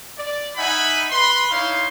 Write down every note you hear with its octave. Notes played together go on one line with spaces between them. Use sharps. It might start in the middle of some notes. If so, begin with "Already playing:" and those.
D5
D#4 E5 F#5 G#5 B5
B4 B5 C6
D#4 E4 C#5 F5 C6